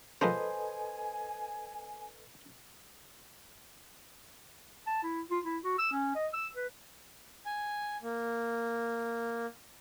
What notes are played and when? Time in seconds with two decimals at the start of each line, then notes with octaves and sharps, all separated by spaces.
0.21 F3 G#3 A#3 A4 B4 C5 D#5 G#5
4.87 A5
5.03 E4
5.31 F4
5.45 E4
5.64 F#4
5.79 E6
5.92 C#4
6.15 D#5
6.33 E6
6.55 B4
7.46 G#5
8.02 A#3